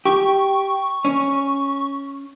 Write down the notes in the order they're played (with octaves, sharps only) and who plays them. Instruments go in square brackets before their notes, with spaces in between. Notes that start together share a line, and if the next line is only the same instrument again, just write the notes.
[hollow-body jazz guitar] G4 [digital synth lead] C#6
[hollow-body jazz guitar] C#4